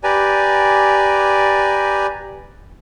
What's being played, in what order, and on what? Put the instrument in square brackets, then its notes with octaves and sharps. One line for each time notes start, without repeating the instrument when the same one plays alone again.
[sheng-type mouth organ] G4 B4 D5 G#5 A#5